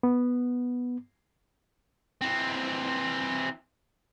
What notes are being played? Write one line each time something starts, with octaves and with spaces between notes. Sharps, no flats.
B3
E3 C4